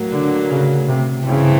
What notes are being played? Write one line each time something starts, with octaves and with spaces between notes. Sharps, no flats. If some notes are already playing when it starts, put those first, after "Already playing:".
Already playing: A2 F#3 A#3
D3
C#3
C3
G2 C#3 E3 A3 C4